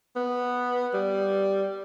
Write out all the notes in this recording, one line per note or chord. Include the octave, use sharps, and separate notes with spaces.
B3
G3